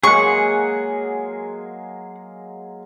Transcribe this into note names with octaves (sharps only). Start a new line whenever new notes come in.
F#3 G#3 A#3 G#4 F#5 C#6